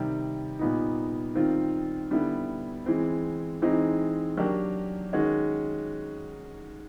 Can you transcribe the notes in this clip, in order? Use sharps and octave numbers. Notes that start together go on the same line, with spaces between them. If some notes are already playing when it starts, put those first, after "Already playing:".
Already playing: C3 D#3 G3
A#2 G3 B3 D#4
D#3 G3 C4 F4
D3 G3 B3 E4
E3 G#3 C4
E3 G#3 C4 D#4
F#3 A#3 D4 G4
D#3 G#3 C#4 F#4